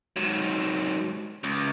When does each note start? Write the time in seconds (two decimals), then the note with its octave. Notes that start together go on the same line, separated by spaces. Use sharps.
0.16 G#2 F#3
1.44 C#2